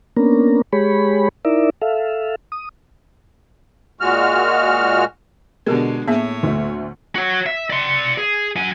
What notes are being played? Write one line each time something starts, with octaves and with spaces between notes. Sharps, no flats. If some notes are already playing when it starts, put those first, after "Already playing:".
A#3 B3 C#4 D4 A#4
G#3 G4 G#4 C#5 B5
D#4 E4 A#4 D5 E5
A4 E5 F5
D#6
A#2 G#3 F#4 F6
B2 D3 G#3 B3 G4 A#4
A2 A#3 B3 G#4 C#5 E5
D2 A3
F#4 C#5
E5
D5 C6
G#4
F#3 G#5